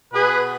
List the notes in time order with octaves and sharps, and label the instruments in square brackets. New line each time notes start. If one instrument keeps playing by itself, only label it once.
[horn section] B2 G#4 B4